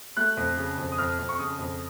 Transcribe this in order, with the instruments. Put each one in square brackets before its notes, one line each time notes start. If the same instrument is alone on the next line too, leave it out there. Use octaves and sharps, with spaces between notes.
[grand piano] A3 F#6
F2
C#3
F2
D#6
F2 F6
F2
C#6
C#3 D#6
F2